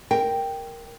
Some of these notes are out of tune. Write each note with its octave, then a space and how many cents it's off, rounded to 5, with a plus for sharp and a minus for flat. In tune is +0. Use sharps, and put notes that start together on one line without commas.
A#4 +0 G5 +0